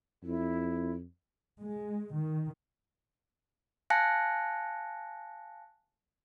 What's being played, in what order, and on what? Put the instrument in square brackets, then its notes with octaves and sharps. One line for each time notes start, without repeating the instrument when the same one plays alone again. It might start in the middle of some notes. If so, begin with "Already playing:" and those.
[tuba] F2 [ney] E4
[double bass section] G#3
D#3
[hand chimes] F5 G#5 A5 F#6 A#6 C#7